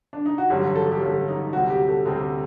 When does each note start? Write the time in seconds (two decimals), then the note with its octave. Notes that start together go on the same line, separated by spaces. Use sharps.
0.13 D4
0.26 D#4
0.38 F#4
0.50 A1 G2 D3 F#3 G4
0.76 A4
0.92 G4
1.01 A1 G2 D3 F#3 A4
1.28 D#4
1.53 D2 C3 G3 F#4
1.70 G4
1.88 A4
2.05 D2 C3 G3 A4